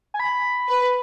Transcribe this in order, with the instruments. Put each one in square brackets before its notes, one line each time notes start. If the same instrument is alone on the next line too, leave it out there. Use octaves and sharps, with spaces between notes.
[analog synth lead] G#5
B5
[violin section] B4